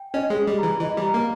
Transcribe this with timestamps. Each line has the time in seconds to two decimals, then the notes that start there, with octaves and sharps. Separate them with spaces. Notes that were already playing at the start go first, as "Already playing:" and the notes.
Already playing: G5
0.14 C#4 D#5
0.30 G#3
0.36 G#4
0.47 G3
0.59 E3 A#5
0.80 E3 D#5
0.97 G3 A#5
1.14 A#3